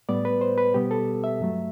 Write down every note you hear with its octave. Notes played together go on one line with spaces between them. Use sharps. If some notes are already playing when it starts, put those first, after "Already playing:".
A2 G3 B3 D5
B4
C5
B4
B2 G3 B3 G4
A4
E5
G2 F#3 A3